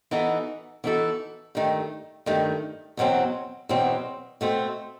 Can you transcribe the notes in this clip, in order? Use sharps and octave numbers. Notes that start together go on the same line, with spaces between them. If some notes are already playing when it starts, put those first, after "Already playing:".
E3 B3 D#4 F#4 A4
E3 B3 D#4 F#4 A4
G2 D#3 A3
G2 D#3 A3
E2 B2 F#3 C4
E2 B2 F#3 C4
B2 A3 C4